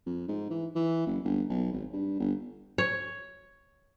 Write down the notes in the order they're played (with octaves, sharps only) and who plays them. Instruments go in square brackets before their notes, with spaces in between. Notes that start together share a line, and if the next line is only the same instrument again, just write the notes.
[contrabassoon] F2
G#2
E3
E3
F#1
G1
B1
G#1
G2
G1
[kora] C#5